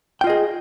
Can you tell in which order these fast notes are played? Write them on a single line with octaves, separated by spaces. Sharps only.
G5 F4 D#5 G#4